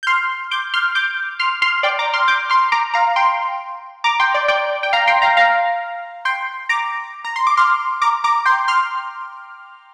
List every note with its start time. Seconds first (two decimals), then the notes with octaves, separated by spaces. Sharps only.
0.03 G6
0.07 C6 F6
0.51 D6 G6
0.74 C6 F6
0.95 D6 G6
1.39 C6 F6
1.62 C6 F6
1.83 D5 G5
1.99 A#5 D6
2.13 C6 F6
2.28 D6 G6
2.50 C6 F6
2.72 A#5 D6
2.94 F5 A#5
3.16 G5 C6
4.04 A#5 D6
4.20 G5 C6
4.34 D5
4.48 D5 G5
4.83 G5
4.93 F5 A#5
5.07 G5 C6
5.22 F5 A#5
5.37 F5 A#5
6.25 G5 C6
6.69 A#5 D6
7.25 A#5
7.36 C6
7.47 D6
7.57 C6 F6
8.02 A#5 D6
8.24 A#5 D6
8.45 G5 C6
8.68 C6 F6